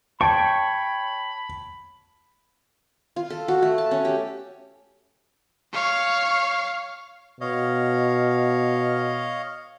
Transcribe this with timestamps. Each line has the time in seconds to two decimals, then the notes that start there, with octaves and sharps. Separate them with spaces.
0.21 C#5 G5 A5 B5 C#6
3.16 F4
3.30 A4
3.48 F#4
3.62 A3
3.78 A5
3.91 C#4
4.05 G4
5.72 C#5 F5
7.41 B2 C#5 D#5 F5